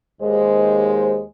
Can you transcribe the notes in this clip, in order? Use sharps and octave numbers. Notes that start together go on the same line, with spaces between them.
D#2 G#3 C5